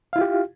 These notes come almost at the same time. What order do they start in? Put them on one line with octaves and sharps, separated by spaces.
F5 E4 F4 G4